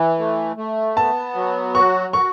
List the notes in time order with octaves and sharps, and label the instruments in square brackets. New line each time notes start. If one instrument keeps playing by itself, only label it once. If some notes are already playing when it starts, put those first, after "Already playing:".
Already playing: [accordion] E3
A3
A3
[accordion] B3 [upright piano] A5
[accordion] F#3
[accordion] F#4 [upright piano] C#6
[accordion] F#4 [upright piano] C#6